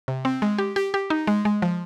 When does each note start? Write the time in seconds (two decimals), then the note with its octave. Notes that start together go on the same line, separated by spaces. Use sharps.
0.08 C3
0.25 C4
0.42 G#3
0.58 G4
0.76 G4
0.94 G4
1.10 D#4
1.27 G#3
1.45 G#3
1.62 F3